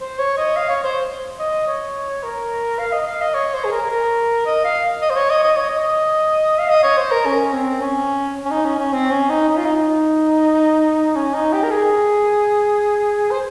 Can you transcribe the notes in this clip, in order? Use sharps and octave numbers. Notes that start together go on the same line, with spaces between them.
C5
C#5
D#5
F5
C#5
C5
D#5
C#5
A#4
F5
D#5
F5
D#5
C#5
C5
G#4
A#4
A#4
D#5
F5
D#5
C5
C#5
D#5
D#5
C#5
D#5
F5
D#5
C#5
C5
A#4
C#4
C4
C#4
C#4
D#4
C#4
C#4
C4
C#4
D#4
D#4
F4
D#4
D#4
C#4
D#4
G4
A#4
G#4
C5